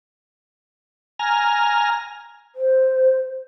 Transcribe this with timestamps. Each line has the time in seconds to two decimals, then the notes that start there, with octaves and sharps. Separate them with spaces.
1.19 G#5 A#5 F6
2.55 C5